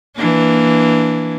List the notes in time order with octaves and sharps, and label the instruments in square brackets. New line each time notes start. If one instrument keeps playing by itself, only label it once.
[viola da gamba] E3 A#3 D4